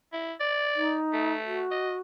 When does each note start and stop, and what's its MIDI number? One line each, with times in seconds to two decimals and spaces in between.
0.13 0.33 64
0.40 0.96 74
0.76 1.33 63
1.13 1.63 57
1.46 1.99 66
1.71 1.94 75